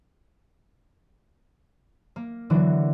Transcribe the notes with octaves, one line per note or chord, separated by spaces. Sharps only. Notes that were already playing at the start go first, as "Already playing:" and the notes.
A#3
D3 E3 F#3 F#4